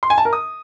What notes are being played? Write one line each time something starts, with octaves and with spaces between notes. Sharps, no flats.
C6
G#5
A5
A#4
D#6